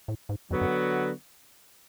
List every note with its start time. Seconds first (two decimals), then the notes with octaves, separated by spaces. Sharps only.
0.08 A2
0.29 G#2
0.51 F2 D3 F#3 B3 F#4
0.61 F#2